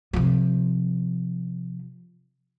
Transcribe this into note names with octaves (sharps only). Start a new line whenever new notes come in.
C3 F3